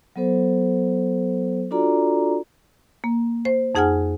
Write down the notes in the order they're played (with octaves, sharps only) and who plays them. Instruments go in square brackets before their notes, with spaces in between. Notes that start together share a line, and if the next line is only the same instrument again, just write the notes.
[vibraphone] F#3 B3 A4 C5
D4 F4 F#4 A4 D5 A#5
[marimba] A#3
C5
F2 D#4 G#4 F#5 G#5 F6